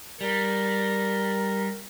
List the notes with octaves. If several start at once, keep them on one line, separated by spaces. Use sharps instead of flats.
G3 A#4